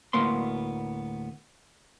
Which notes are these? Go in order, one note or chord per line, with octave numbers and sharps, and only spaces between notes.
D2 A2 A#3 B3 C6